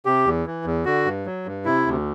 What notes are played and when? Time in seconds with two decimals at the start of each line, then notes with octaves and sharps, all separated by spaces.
0.05 C3 G4
0.26 E2
0.46 E3
0.65 E2
0.85 D3 F#4
1.06 G2
1.26 F#3
1.46 G2
1.65 C3 E4
1.86 D2